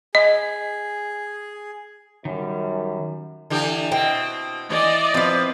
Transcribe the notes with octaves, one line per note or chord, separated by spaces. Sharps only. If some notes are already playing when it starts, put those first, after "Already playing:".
G#4 D#5
F#2 D#3 G3
D3 E3 G4
B2 C4 G5
E3 D5 D#5
F3 C4 B4